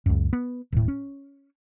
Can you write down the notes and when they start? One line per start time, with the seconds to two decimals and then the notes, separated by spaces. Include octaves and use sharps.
0.06 C#2 F#2
0.33 B3
0.72 D#1 A2
0.88 C#4